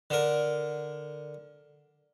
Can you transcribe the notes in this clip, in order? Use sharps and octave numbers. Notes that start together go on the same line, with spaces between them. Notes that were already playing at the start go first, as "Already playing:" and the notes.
D3 A#4